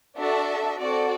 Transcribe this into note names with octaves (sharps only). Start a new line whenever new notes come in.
D4 F#4 A4 E5
C4 F#4 A4 D5